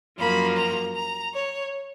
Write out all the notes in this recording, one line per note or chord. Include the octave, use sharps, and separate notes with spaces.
F#2 F3 A#3 B5
A#5
A#5
C#5